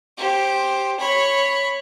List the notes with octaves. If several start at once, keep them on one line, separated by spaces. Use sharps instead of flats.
G4 C5
C#5 B5